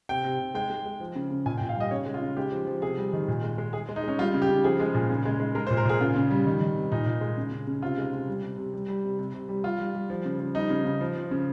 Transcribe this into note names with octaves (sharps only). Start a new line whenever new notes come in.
C3 G5
C3
C3
G#3 G5
G#3
G#3
F3
C#3
C#3
A#2 G#5
G5
A#2
F5
G3 D#5
C#3 C#5
G#3
F4
C#3
G#3 G4
F3
F3
C3 G#4
G3
D#3
A#2
G#3
G#3
G#3 G#4
G#3
D#4
G#3 C#4
G3 F4
C#3
G4
C#3
F3 G#4
G#3
A#2
C#3
G#3
G#3
G#3 A#4
C5
A#2
A#4
A#2 G#4
C#3 F4
C#3
G3
D#3
D#3
C3
A#2 D#4
A#2
G#3
C#3
C#3
C#3
C3 F4
G#3
C3
G3
C3
C3
G3
G3
C3
C3
C3
G3
G3 F4
G3
G3
F3
C#3
F3
G3 D#4
C#3
C#3
F3
F3
C#3